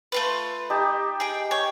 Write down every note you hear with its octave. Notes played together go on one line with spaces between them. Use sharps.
A3 F4 B4
D#4 G4 A5
G#4 G5
C#5 G5